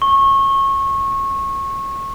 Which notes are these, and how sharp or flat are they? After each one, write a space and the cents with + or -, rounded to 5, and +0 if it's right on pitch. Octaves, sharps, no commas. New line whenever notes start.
C#6 -25